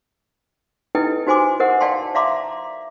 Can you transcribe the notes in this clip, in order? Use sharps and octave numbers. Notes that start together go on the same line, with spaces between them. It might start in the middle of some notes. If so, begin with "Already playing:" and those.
D#4 E4 A4 B4 D#5 G5
D#4 F#4 C5 G#5 C6 D6
A#4 C5 D#5 F#5
D5 F5 G5 A5 C6
D5 E5 F5 A#5 C6 D6